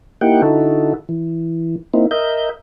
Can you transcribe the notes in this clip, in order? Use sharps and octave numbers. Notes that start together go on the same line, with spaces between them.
A#3 D#4 E4 G4 F#5 G5
D3 D#4 E4 F#4 A4
E3
A#3 C4 D#4 E4
A#4 D#5 E5 G6